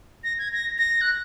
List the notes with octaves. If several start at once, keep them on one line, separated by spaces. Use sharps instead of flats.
A#6
G#6
A#6
A#6
F#6